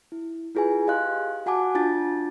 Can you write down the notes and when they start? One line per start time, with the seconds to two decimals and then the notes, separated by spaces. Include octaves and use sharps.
0.12 E4
0.55 E4 F4 G#4 B4 G#5
0.87 G4 D#5 F5 C6 F#6
1.46 F#4 F#5 G#5 A5 D6
1.75 D4 F4 A5 A6